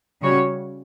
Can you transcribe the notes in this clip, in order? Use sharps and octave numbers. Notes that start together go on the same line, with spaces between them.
C#3 G3 C#4 F#4 C#5